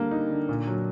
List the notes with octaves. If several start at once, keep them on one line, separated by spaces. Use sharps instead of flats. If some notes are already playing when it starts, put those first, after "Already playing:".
Already playing: D3 G3 A#3
D#4
D3
A#2
F#3